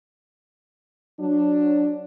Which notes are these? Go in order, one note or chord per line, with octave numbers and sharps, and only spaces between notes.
F#3 D4